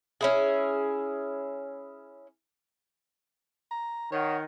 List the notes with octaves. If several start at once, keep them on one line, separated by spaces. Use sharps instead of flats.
C#4 E4 G#4
A#5
D#3 C#5 D#5 F#5